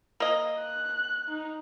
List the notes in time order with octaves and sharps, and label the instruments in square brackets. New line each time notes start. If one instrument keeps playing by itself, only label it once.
[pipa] A#3 D#5
[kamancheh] F#6
D#4